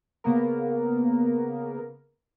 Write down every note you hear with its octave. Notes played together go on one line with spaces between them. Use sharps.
C#3 A#3 B3 A#4